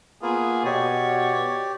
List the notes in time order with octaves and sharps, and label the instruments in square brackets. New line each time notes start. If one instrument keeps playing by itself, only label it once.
[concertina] A#3 B3 F4 [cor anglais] G#4
[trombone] B2 [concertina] G4 D5 [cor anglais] C#5